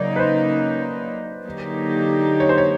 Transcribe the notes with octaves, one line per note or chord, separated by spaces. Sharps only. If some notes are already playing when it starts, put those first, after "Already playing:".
Already playing: C#3 F#3 A#3 D#4 D5
B4
C5
D3 F#3 A#3 D#4 G4
C#5
C5
C#5